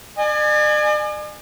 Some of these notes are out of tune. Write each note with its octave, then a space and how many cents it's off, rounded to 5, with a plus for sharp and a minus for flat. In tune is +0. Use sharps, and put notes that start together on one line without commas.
D5 +45 G#5 +5